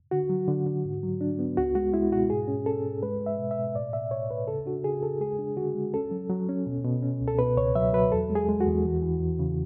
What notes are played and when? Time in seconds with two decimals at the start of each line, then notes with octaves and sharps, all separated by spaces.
0.11 D3 F#4
0.30 F#3
0.48 D3
0.67 D3
0.85 G#2
1.03 F#3
1.21 D4
1.39 B3
1.57 C#2 F#4
1.75 G#3 F#4
1.93 G#3 E4
2.12 B2 F#4
2.30 G#2 G#4
2.48 C#4
2.66 C#4 A4
2.84 G#2
3.03 G#3 B4
3.21 G#3
3.26 E5
3.39 B2
3.51 E5
3.57 B2
3.75 A2 D5
3.93 A2 E5
4.11 A2 C#5
4.30 A2 B4
4.48 C#3 A4
4.66 D4 F#4
4.84 C#3 G#4
5.03 C#3 A4
5.21 G#3 G#4
5.39 D4
5.57 D3 F#4
5.75 G#3
5.94 C#4 A4
6.11 F#3
6.30 F#3
6.49 C#4
6.67 B2
6.84 B2
7.03 C#4
7.21 C#2
7.28 A4
7.39 B2 B4
7.57 C#2 C#5
7.76 F#3 E5
7.93 F#3 B4
8.12 E2 A4
8.30 G#3
8.35 G#4
8.49 G#3
8.61 F#4
8.67 E2
8.85 E3
9.02 E3
9.20 E2
9.39 C#3